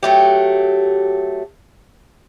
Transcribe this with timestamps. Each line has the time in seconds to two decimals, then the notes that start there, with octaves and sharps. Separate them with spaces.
0.03 F#3 A3 G4